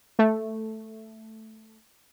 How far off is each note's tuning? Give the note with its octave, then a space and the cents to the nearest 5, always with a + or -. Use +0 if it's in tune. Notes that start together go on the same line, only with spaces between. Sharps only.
A3 +0